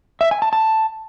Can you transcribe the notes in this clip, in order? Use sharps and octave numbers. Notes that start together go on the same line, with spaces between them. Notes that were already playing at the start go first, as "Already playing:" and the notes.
E5
G#5
A5
A5